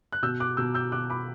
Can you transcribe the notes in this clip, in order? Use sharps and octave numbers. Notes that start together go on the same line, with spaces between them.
F#6
B2 E6 G6
D6 F#6
B2 E6 G6
E6 G6
B2 D6 F#6
B5 D6